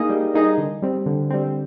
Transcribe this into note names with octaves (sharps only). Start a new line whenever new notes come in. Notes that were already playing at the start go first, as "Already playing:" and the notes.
Already playing: A#3 D#4 G#4 D#5
G3
A#3 D#4 G#4 D#5
D3
G3 C4
D3
G3 C4